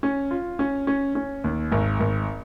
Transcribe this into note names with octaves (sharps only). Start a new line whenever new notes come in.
C#4
F4
C#4
C#4
C#4
D#2
G#1
G#1